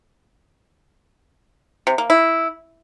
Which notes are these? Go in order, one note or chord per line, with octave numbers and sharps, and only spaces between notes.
C3
A#3
E4